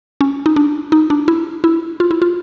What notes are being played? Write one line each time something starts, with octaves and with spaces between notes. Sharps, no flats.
C#4
D#4
D4
D#4
D4
E4
E4
F4
E4
F4